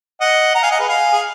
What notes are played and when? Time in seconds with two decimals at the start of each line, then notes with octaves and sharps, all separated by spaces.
0.20 D#5 F#5
0.55 F#5 A#5
0.63 F5 G#5
0.71 D#5 F#5
0.79 G#4 B4
0.88 F5 G#5
1.13 G#4